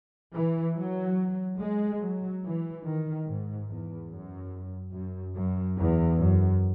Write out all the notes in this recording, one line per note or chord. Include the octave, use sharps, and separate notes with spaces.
E3
F#3
G#3
F#3
E3
D#3
G#2
E2
F#2
F#2
F#2
E2
F#2